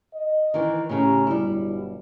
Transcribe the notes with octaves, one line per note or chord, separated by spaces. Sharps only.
D#5
D#3 E3
A2 C#3 G4 A#5
G1 B2 F#3 G3 E4